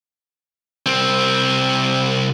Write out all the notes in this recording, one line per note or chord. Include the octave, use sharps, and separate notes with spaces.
C2 C4